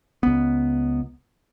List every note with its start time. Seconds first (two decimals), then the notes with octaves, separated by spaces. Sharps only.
0.23 C#2 B3